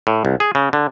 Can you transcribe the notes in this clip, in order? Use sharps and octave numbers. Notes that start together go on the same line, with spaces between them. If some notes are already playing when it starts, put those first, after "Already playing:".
A2
C2
G#4
C#3
D3